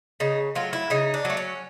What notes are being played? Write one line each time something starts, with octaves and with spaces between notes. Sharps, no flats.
C#3 D#4
F#3 A3 F4
E4
C#3 D#4
D4
F#3 A3
C#4